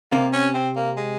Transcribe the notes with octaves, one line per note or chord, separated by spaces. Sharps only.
C3 A#3
C#4
C4
A#3
G#3